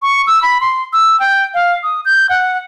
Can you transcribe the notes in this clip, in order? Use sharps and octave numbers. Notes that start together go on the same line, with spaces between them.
C#6
E6
B5
C6
E6
G5
F5
D#6
G6
F#5